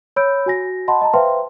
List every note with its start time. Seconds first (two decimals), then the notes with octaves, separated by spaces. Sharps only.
0.16 C#5 B5 E6 G6 D7
0.46 F#4 G#5 A#6
0.88 D#5 F#5 A5 B5 C6
1.01 D#5 A5 A#5
1.13 B4 C5 E5 F5 G5 C6